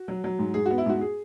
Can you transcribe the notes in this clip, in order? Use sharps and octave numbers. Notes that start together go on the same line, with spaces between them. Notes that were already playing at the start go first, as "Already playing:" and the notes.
Already playing: F#4
F#3
F#3
G#2
G#2 G#4
B3 F#4
E4
G#2 F#4
G#4